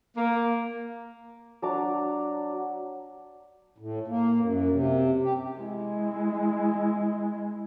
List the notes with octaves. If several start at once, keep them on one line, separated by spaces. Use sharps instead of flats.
A#3
F#3 D4 A#5 D6
A2
A#3
F#2
C3
G4
G#3 E4